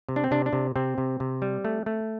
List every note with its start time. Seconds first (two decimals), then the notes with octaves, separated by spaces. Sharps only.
0.09 C3
0.16 D4
0.24 C4
0.31 C3 D4
0.46 D4
0.53 C3
0.76 C3 C4
0.98 C3
1.20 C3
1.42 G3
1.65 A3
1.86 A3